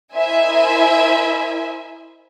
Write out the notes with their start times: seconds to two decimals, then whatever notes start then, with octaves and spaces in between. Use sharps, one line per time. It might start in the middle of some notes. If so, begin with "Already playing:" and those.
0.13 E4 A#4 C5 D#5 E5 G#5